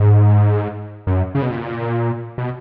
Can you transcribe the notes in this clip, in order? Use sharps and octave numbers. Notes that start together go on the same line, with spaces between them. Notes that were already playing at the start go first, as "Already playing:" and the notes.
Already playing: G#2
F#2
C#3
B2
A#2
B2